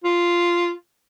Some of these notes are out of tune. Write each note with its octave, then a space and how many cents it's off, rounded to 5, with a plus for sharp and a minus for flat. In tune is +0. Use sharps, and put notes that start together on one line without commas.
F4 -5